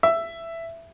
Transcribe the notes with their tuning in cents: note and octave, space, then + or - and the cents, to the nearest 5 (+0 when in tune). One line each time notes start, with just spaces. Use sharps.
E5 +10